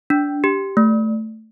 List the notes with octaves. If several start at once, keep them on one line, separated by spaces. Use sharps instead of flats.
D4
G4
A3